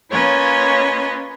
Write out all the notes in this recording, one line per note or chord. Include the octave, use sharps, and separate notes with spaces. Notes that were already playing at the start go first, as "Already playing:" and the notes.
A#3 C#4 F4 B4 C#5 D#5